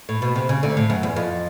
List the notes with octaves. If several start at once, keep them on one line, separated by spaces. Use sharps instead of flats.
A2
B2
C3
C#3
D2 D3
A2
F#2
E2
F2